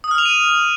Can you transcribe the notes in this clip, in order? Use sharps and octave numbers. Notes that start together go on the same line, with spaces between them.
D#6
F6
F7
D#7